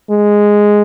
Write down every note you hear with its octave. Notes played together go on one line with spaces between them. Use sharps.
G#3